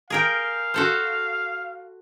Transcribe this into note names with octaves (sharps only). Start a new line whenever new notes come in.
G#4 A#4 F5 G5
F#4 A4 C5